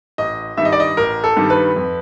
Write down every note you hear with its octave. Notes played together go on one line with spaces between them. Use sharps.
A1 D#5
G2 D#3 G3 E5
D#5
D5
D#5
A1 A#4
A4
G2 D#3 G3
B4
F2